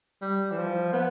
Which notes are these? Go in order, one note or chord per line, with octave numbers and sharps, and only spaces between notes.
G3
E3
F3
B3